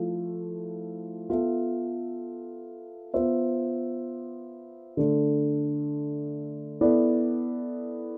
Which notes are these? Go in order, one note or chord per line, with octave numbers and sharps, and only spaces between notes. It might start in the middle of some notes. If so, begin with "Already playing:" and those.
Already playing: F3 A3 E4
B3 F4 A4 E5
B3 F4 C5 E5
D3 A3 D4
B3 E4 A4 D5